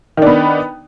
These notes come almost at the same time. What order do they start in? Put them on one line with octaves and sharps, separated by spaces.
D#3 D4 B3